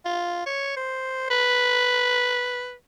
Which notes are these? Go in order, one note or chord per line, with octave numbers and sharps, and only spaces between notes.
F4
C#5
C5
B4